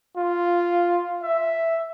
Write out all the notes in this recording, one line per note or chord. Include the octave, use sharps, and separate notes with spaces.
F4
E5